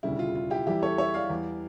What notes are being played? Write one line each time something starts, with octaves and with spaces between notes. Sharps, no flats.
E1 D2 C#3 G3 E4
F4
F4
E4 G4
E2 E3 G3 E4 G4
A4 C#5
C#5 E5
D5 F5
E2 E3 G3